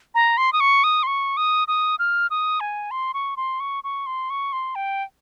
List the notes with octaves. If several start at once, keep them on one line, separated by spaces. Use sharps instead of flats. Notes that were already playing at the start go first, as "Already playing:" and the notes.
A#5
C6
D#6
C#6
D#6
C6
C#6
D#6
D#6
F6
D#6
G#5
C6
C#6
C6
C#6
C#6
C6
C#6
C6
G5